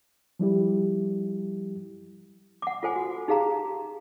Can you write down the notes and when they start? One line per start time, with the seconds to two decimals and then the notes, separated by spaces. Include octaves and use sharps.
0.39 F3 G3 E4 G4
2.62 F#5 D6
2.83 F4 A4 C5 G#5
2.96 F#4
3.28 D#4 G4 G#4 F5 A#5 B5